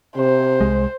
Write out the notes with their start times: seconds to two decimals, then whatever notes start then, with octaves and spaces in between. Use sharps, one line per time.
0.17 C3 C5
0.61 C2 G#3